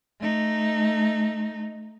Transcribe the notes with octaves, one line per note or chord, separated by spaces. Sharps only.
A3 D#4